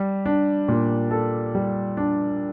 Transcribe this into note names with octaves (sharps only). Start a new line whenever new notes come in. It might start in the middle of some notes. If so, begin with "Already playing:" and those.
Already playing: G3
D4
A#2
A4
G3
D4